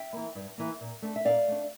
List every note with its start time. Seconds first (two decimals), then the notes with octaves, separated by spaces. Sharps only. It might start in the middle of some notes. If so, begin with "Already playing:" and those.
Already playing: E5 G5
0.13 E3 A#3
0.35 G2
0.58 E3 A#3
0.80 A#2
1.02 A3 D4
1.16 E5
1.25 A#2 D5 F5
1.48 A3 D4